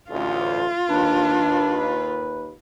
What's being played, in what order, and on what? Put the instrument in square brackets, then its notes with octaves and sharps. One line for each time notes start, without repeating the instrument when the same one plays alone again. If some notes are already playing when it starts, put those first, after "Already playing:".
[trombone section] A1 D2 [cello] F4
[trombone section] D#2 B4 [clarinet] D4